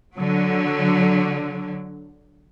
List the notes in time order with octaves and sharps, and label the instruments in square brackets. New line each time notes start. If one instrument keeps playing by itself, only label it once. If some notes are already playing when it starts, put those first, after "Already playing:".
[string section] D3 F#3